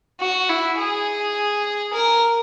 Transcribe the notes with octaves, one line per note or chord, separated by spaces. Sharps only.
F#4
E4
G#4
A#4